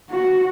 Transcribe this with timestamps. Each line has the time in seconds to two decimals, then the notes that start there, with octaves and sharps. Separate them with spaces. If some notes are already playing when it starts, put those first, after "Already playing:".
0.10 F#4